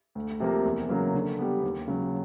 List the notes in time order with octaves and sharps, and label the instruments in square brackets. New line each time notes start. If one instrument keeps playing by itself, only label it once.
[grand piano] D2
C3 F3 A#3
E2
C#3 F#3 A#3
D3
G3 B3
D#2
C#3 F#3